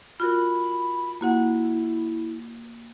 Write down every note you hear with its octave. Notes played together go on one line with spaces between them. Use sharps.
F4 F#4 A#4 B5
A#3 E4 F#4 F#5